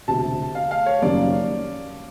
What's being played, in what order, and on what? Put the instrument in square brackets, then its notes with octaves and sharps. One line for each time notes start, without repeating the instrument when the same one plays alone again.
[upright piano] E1 D2 C3 [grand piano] A5
[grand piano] F5
F5
C#5
[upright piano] F#1 F#2 D#3 G3 A#3 [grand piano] D5